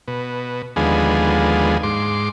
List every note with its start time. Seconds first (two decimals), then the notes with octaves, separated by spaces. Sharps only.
0.08 B2
0.76 D#2 D3 F3 G#3 B3 G#4
1.83 G#2 C6 D6